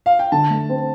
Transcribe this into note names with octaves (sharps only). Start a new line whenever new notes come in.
F5
G5
D3 A5
A3
C4